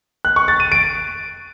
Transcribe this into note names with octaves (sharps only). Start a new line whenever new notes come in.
F#6
C#6
A6
D#7
D7